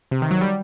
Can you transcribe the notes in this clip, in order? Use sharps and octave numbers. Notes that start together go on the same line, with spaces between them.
C3
D#3
F#3
G3